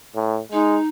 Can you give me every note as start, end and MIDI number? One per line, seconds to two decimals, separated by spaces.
0.16 0.40 45
0.52 0.78 56
0.52 0.87 63